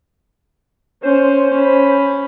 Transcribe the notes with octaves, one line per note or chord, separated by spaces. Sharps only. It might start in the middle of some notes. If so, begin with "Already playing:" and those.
C#4 C5
C#4 B5